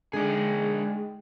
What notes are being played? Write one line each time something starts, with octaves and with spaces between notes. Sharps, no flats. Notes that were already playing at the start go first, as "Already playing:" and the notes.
D3 G#3 D4 D#4 G#4 G5